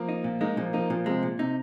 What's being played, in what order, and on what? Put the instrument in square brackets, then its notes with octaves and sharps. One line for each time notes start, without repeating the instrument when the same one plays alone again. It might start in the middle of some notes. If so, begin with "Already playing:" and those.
Already playing: [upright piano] F3 A#3
[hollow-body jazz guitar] D#4
A#2
[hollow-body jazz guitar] G#3 [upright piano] A#3 D#4
[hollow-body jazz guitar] A#2 [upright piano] F3 A#3
[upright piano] F3 A#3 [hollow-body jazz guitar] D#4
[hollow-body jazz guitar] A#2 [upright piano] F3 A#3
[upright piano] C3 F3 [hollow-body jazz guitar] G#3
[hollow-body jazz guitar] A#2
[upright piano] C3 [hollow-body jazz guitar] D#4